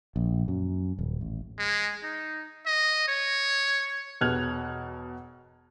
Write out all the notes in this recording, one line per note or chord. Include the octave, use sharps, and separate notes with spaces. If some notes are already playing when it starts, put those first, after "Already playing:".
A#1
F#2
D#1
A1
G#3
D#4
D#5
C#5
E1 B2 F6 F#6 G#6 F7